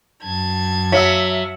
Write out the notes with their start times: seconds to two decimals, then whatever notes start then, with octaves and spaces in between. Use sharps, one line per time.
0.23 F#2 A5 G#6
0.92 F#3 E5 F5 E6